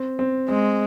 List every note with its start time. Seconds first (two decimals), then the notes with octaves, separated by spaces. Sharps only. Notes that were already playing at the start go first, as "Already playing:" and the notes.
Already playing: C4
0.19 C4
0.48 G#3 C4